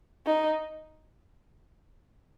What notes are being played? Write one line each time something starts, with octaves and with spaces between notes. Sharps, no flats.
D#4